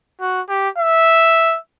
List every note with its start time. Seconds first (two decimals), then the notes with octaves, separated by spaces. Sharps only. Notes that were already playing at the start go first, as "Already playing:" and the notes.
0.21 F#4
0.49 G4
0.78 E5